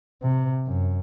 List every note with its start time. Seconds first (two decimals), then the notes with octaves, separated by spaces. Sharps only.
0.23 C3
0.67 F#2